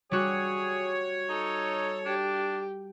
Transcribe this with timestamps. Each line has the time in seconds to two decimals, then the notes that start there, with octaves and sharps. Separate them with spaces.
0.11 G3 F#4 G#4 C#5
1.29 D#4 A4
2.06 D4 G4